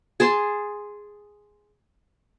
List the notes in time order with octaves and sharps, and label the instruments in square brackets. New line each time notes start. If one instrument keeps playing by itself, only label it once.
[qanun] G#4 A5 C6